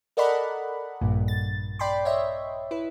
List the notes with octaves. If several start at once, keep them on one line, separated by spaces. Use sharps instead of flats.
A4 A#4 D5 D#5 F#5 B5
A#1 G2 A#2
A6
D5 G5 B5 C6
C#5 D#5 E5
E4 B4